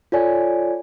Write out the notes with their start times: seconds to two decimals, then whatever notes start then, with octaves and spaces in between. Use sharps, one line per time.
0.12 F4 A4 C#5 D5 G#5